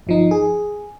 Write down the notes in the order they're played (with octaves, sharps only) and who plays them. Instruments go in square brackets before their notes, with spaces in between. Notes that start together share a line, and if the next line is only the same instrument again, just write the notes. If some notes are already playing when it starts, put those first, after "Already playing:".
[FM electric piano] G1 F3 D#4
G#4